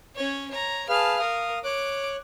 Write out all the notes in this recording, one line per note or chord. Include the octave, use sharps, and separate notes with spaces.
C#4 C#5
C#5 A#5
G#4 B4 F5 A5 F6
A#4 F5 D#6
C#5 D6 F#6